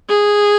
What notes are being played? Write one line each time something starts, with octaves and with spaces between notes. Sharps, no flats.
G#4